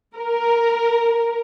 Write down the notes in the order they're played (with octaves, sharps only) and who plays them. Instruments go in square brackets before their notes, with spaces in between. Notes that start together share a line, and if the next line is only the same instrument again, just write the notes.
[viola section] A#4